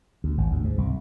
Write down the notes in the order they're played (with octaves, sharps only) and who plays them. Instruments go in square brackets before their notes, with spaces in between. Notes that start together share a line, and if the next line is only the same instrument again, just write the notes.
[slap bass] D2
G#1
D2
G#2
C2